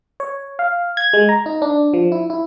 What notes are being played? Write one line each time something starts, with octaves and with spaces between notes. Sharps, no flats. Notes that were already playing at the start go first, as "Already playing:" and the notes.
C#5
F5
G#6
G#3
A#5
D#4
D4
F3
E4
E4